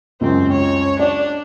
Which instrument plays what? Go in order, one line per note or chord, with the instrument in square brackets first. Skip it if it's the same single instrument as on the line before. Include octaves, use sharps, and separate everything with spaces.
[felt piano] C#2 F#2 [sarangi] C4
[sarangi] C#5
[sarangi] D4 [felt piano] D5